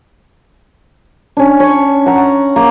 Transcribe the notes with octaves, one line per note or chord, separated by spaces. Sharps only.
C#4 D4
C#5
F#5 A#5
A#3